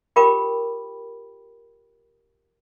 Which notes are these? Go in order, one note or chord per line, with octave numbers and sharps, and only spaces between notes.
F4 G4 A#4 G5 B5 D6